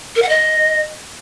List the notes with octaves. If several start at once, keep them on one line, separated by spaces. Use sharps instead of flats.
A#4
F#5
D#5